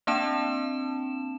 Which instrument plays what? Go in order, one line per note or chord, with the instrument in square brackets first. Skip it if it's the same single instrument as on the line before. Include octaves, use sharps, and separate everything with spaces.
[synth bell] A#3 C4 D4 A5 E7